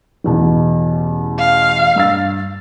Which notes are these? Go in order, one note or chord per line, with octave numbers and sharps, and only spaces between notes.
A1 E2 B2
F5
G2 E6 A6